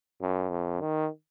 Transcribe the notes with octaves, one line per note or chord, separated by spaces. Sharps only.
F#2
F2
D#3